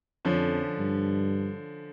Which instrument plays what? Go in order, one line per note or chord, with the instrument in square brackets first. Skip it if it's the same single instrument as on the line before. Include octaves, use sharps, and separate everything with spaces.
[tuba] F2 [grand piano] D3 F3 C#4
[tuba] G2